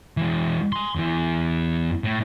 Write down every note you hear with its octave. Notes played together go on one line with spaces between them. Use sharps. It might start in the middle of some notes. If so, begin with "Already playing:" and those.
E3 G#3
G#5 C6
E2 E3
A2